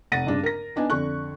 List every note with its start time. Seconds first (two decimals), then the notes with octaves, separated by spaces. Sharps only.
0.12 F1 F#5 A6 A#6 D#7
0.27 G2 C#3 D4
0.43 A#4 A#6
0.76 B3 D4 D#4 G#5
0.90 F2 D3 C#6 F#6